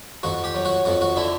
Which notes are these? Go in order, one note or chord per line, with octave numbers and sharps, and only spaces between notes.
F2 F#4
G4
F#3
F#4
F2 F#4
F#4
D3 E4